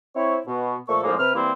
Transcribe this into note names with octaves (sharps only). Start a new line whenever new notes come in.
C4 E4 C#5
B2
A#2 F3 A3 A4 C#6
C2 F2 A2 F3 G#3 A#3
C3 B4 F6
E3 G3 A#3 C4 E4